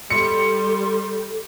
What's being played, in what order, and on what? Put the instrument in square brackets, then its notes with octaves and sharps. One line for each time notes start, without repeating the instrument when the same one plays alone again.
[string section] G3 [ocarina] A4 [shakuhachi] C6 [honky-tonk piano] C#7